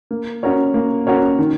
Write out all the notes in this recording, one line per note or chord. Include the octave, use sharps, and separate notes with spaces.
A#3
C#4 F#4 A#4 C#5
A#3
C#4 F#4 A#4 C#5
D#3